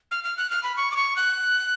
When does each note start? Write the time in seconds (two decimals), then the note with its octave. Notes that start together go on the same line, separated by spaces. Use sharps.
0.11 F6
0.24 F6
0.37 F#6
0.50 F6
0.63 B5
0.77 C#6
0.92 D6
0.96 C#6
1.16 F#6